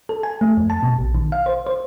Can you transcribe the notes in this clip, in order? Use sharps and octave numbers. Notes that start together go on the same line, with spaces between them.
A4
G#5
A3
F2
A5
B2
A#1
D#3
F5
C5
C5